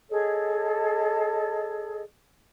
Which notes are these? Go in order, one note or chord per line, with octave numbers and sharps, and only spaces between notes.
G#4 A4 C#5 D#5